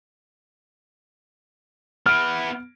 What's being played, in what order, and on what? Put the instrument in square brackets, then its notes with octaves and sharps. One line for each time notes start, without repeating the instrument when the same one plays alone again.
[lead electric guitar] B3 E4 [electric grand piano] F6 D7